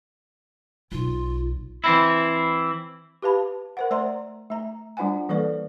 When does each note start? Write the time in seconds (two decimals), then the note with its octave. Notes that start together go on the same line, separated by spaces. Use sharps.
0.92 B1 F4
1.84 E3 C4 E4
3.22 G4 B4 F5 A5 B5
3.77 A#4 C5 F#5
3.91 A3 C5 D5 A#5 C6
4.50 A3 A#5
4.97 G3 D4 F4 C5 F#5 G#5
5.29 E3 G3 A#3 A4 B4 D5